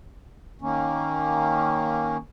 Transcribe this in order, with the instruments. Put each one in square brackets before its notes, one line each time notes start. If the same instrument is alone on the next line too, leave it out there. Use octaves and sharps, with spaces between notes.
[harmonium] D#3 A#3 C#4